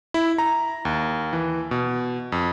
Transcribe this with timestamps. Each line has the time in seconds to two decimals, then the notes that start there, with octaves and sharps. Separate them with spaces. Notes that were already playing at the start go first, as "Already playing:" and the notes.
0.14 E4
0.38 A#5
0.85 D#2
1.33 E3
1.71 B2
2.32 F2